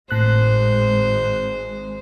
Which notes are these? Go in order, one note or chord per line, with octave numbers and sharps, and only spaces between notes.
G#1 A2 G#3 C5 F#6